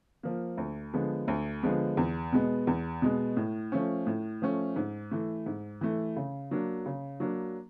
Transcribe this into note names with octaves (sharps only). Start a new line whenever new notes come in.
F3 A#3
D2
D3 F3 G#3 B3
D2
D3 F3 G#3 B3
E2
B2 G#3 B3
E2
B2 G#3 B3
A2
F3 A3 C#4
A2
F3 A3 C#4
G#2
E3 A3
G#2
E3 A3
C#3
F#3 A#3 D4
C#3
F#3 A#3 D4